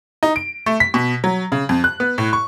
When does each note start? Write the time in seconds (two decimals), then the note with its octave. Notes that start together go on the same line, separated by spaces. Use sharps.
0.23 D#4
0.36 D7
0.66 A3
0.80 B6
0.94 B2
1.24 F#3
1.52 C#3
1.69 F2
1.84 F#6
2.00 B3
2.18 A2
2.33 C#6